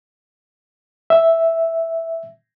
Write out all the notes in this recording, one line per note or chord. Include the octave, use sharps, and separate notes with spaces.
E5